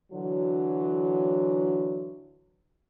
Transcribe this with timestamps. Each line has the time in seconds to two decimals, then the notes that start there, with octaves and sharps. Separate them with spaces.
0.12 D3 E3 F#3